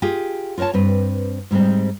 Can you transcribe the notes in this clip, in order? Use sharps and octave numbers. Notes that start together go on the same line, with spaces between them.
F4 G4 G#4
F4 A#4 C5 C#5 A5
G2 C4 B4
G#2 G3 G#3 C4